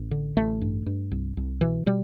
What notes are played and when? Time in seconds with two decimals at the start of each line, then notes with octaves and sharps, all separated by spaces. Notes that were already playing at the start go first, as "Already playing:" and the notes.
Already playing: A1
0.11 D3
0.37 A1 A3
0.61 G2
0.86 G2
1.12 C2
1.37 C2
1.61 B2 E3
1.86 B2 G3